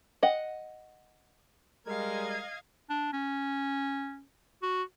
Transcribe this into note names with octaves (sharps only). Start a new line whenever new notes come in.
D#5 F#5
G3 G#3 A#4 D#5 F5 G#6
D4
C#4
F#4